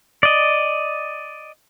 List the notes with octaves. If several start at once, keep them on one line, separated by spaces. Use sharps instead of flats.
D5 D#5